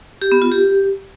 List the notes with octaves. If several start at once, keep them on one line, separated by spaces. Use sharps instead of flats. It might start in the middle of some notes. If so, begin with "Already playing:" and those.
G4
B3
F4
G4